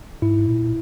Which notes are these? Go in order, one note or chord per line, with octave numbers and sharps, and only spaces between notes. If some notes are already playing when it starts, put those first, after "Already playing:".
G#2 E4
A#2